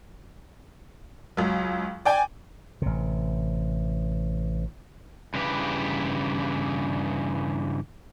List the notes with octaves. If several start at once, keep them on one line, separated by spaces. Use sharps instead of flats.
C#2 F#3
D5 G5 G#5
A1 C3
G2 C#3 E3 G4 B4